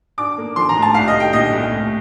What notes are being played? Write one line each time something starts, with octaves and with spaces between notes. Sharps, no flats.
D4 D6
A#3
F3 C6
A#5
A2
A5
C2 F5
D#5
G3
G5
A#2 D#5
C2
A2